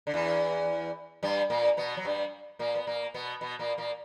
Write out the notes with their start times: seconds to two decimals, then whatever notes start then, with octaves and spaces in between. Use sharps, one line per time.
0.07 D3
0.14 E2 E3
1.23 G2 G3
1.50 A#2 A#3
1.77 B2 B3
1.97 F#3
2.05 G2 G3
2.59 A#2 A#3
2.76 B3
2.87 A#2 A#3
3.14 B2 B3
3.41 B2 B3
3.59 A#2 A#3
3.78 A#2 A#3